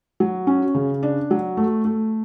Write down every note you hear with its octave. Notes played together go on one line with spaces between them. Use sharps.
F#3
C#4
C#3
D4
F#3
A3
A3